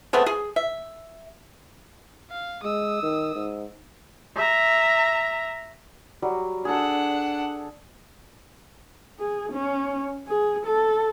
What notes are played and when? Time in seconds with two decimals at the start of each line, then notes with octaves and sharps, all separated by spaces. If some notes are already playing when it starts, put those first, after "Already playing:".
0.13 A3 B3 C4 G#4
0.26 G#4
0.56 E5
2.30 F5
2.64 G#3 D#6 E6
3.03 D#3
3.35 G#2
4.36 E5 A#5
6.22 F#3 G3
6.65 D4 G#4 A4 F#5
9.20 G#4
9.53 C#4
10.28 G#4
10.66 A4